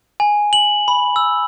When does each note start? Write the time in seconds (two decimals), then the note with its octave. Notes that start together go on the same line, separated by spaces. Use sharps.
0.20 G#5
0.53 F#7
0.88 B5
1.16 E6